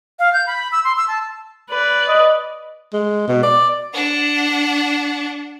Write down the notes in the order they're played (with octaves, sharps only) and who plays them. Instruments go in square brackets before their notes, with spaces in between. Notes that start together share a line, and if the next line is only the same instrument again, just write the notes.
[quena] F5
G6
B5
E6
C6
E6
A5
[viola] B4 D5
[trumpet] D#5
[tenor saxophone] G#3
B2
D5
[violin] D4 F#5